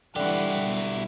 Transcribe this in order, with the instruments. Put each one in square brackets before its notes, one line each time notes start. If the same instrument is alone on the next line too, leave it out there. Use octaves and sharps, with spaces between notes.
[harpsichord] D3 [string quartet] E3 F#5 F#6 [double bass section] G3 [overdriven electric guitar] E4 G4
[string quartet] B2